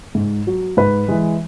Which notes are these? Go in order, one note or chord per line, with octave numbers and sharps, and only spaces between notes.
G#2
F#3
G#2 B4
E3 G#3